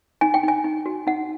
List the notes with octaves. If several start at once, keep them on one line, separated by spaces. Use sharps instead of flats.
D#4 G#5
G5
D#4 G#5
D#4
F#4
D#4 F#5